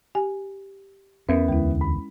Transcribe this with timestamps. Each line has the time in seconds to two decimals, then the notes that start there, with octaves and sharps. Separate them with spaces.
0.15 G4 G#5
1.29 E2 B3 C#4 A#4 E5
1.48 D2 G#3 E4
1.81 B5